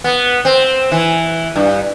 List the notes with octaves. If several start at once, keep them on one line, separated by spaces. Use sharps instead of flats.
B3
C4
E3
G2